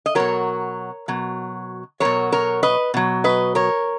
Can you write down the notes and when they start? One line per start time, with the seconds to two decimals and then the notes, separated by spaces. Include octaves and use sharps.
0.06 D#5
0.15 B2 F#3 A#4 C#5
1.08 B2 F#3
2.00 B2 F#3 A#4 C#5
2.32 A#4 C#5
2.63 B4 D#5
2.94 B2 F#3
3.24 B4 D#5
3.55 A#4 C#5